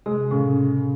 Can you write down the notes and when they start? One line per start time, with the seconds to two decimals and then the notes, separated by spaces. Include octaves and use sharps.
0.06 C3 G#3
0.31 A2 C#3